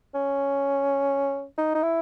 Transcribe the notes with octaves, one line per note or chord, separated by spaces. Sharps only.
C#4
D#4
D#4
E4